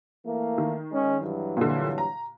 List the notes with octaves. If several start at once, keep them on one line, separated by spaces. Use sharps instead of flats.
E3 A3 A#3
D#3
G#3 C#4
G2 E3 F#3
A#2 D3
A#5